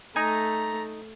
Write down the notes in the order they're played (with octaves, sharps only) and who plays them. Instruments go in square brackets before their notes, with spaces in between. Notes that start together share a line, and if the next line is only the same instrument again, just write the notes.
[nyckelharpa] A3 [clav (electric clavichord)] D#4 G#5 [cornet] A#5